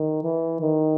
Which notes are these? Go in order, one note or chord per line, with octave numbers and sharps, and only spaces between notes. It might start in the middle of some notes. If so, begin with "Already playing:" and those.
Already playing: D#3
E3
D#3